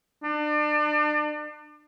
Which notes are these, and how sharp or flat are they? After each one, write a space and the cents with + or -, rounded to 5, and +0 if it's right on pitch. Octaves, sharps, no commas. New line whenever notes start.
D4 +35